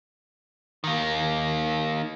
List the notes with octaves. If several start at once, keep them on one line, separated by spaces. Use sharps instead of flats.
D#3 A#3